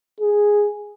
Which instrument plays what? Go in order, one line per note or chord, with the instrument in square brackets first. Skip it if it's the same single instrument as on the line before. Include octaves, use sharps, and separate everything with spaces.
[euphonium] G#4